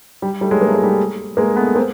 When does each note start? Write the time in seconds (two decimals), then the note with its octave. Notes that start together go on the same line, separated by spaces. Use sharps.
0.22 G3
0.41 G3 A3
0.51 F#3 G#3
0.61 A#3
0.68 A3
0.76 G#3
0.83 G3 A3
1.37 G#3 A#3
1.56 A3 B3
1.76 A#3 C4